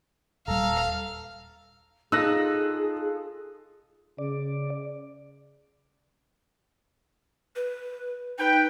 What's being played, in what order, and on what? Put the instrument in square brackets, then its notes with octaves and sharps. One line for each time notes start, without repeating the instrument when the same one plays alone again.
[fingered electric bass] D#1 G3 [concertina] A4 A#5 [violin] F5
[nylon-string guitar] D#4 [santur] F4 A4 [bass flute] G#4 [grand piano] E6 F#6 A#6
[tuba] C#3 [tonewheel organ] D5
[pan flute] B4
[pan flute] D#4 [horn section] B4 G5